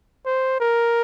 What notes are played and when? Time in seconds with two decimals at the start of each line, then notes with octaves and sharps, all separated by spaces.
0.26 C5
0.61 A#4